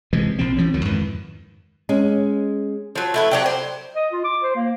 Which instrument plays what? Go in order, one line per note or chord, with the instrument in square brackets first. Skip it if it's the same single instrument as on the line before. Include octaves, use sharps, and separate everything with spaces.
[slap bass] C3 E3 F3 G#3
A#1 F3 C4
E3 F3 C4 C#4
C#2 D#3 F#3
F2 G#2 D#3 E3
[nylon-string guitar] G#3 C#4
[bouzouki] F3 F#3
A3 E4 B4
F#3 D4 G4
C5
[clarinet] D#5
F4
D6
C5
A#3